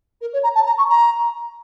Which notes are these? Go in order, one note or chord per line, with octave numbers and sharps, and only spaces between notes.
A#4
C#5
A#5
A5
A#5
C#6
A#5